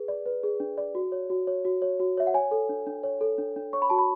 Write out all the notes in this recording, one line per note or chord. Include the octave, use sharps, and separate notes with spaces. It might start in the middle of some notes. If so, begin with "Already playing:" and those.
Already playing: G#4 B4
D5
B4
G#4
D4
D5
F#4
C#5
F#4
C#5
F#4
C#5
F#4
C#5 E5
F#5
C#5 G#5
A4
D4
D4
C#5
A4
D4
D4
C#5 C#6
B5
F#4 A5
B5